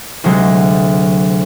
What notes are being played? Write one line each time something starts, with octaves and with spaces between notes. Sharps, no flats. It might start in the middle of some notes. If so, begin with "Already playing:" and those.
D2 C3 F#3 G#3